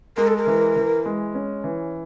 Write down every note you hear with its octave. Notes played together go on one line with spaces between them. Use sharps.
G#3 A#4
A4
A#4
E3
E3
G#3
C#4
E3